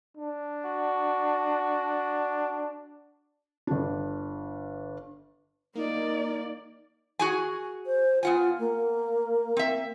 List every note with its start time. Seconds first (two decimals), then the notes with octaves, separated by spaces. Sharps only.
0.17 D4
0.66 F#4
3.67 G1 D4
5.75 A#3 D#4 D5
7.19 F#4 G#4 G#5
7.86 C5
8.23 B3 F4 F#5 G#5
8.59 A#3
9.57 C4 E5